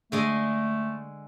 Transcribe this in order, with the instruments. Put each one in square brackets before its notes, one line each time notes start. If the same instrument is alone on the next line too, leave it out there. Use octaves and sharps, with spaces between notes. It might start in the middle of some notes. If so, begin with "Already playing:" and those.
[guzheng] D3 G#3 D#5 [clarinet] A3